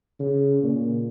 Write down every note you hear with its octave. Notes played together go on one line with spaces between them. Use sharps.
C#3
A#2